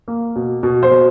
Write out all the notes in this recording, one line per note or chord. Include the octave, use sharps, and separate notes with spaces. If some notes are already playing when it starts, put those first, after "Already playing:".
A#3
B2
B2
C5
B2